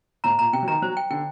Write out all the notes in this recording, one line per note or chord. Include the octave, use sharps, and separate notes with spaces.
A2 A#5
A#2 A#5
C3 G5
F#3
D#3 A#5
F#3 C5
G5
D3 G5